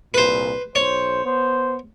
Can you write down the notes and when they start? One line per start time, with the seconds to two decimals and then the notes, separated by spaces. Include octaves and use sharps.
0.14 C2 A#2 B4 C5
0.75 B1 C5 C#5
1.25 B3 C5